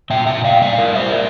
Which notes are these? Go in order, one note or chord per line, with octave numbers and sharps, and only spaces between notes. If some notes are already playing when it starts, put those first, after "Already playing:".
A#2 E5 G5
E5 G5
A#2
D5 F5
G3 D5 F5
A#4 D5
G3
C5 E5
A#4 D5